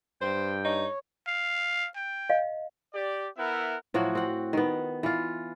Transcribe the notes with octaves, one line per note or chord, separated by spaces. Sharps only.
G2 C5 G5
D#4 C#5
F5
G5
D#5 F5
G4 D5
B3 E4 A#4 E5 F#5
A2 F3 F#3 F#4
C4 F#5
D#3 B3
E3 F4